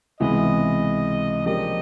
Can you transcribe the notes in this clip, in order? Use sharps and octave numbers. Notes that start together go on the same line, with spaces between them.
C#2 C3 E3 G#3 B3 D#5
C#3 F3 A#3 D4 G4 D#5